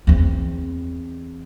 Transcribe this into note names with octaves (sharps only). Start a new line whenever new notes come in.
E2 C4